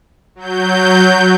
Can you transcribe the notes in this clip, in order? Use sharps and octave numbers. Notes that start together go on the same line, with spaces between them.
F#3 G6